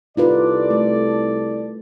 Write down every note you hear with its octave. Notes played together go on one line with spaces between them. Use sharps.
C2 D#4 F4 A4 B4 D5
A3